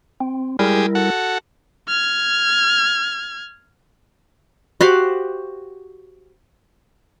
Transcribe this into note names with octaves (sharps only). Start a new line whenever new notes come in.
C4
G3 G#3 E4 G4 G#4 A#4
F#4 A4 F#5
F6 G#6
F#4 G4 C5 F5